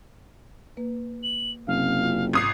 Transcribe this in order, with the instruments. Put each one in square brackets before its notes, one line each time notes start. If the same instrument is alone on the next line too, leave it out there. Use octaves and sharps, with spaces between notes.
[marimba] A#3 B4
[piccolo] F#7
[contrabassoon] F#1 [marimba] C3 C4 [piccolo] F5
[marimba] C#4 F4
[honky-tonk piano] G#1 D#6 C7